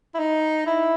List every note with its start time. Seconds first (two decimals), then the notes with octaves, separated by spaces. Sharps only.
0.14 E4
0.19 D#4
0.66 E4